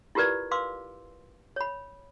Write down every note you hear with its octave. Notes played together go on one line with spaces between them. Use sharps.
E4 F4 G4 A#4 B4 D5
B4 F5 C6 D6 E6
C#5 B5